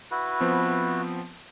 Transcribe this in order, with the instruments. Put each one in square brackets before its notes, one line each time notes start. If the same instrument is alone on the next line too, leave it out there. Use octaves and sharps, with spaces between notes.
[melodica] E4 F#4 B4
[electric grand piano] F3 B3 C4